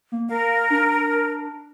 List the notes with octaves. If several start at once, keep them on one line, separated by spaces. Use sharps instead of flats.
A#3
A#4 F5
D4